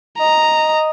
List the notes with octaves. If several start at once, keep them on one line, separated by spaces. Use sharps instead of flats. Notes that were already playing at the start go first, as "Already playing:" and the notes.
D#5 A#5